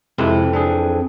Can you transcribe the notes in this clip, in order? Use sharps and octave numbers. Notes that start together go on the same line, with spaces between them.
F2 C3 E3 G#3 E4
C4 D4 G#4